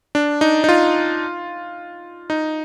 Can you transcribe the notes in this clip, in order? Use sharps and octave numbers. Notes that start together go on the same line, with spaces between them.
D4
D#4
D#4
F4
D#4